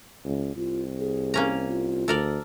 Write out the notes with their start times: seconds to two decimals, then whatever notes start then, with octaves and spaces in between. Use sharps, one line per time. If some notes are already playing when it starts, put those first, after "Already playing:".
0.25 C#2
0.56 C2 F4
0.99 G#4
1.34 A#3 C#4 A#5
1.69 F4
2.08 D2 A4 A#4 D5